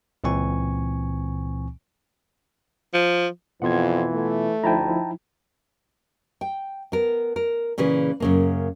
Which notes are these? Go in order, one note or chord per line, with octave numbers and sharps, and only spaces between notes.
C#2 A#2 E3 C4 G#5 C#6
F3
F2 B2 E3 B3 F4 F#5 C6 G#6
A3
D2 F3 D#4 E4 G5 A5 A#5
G5
B3 A#4
A#4
A#2 C#3 E3 G#4 B4
F#2 C#3 A#3